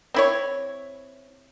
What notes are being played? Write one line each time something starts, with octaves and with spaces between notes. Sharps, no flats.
C4 E4 C#5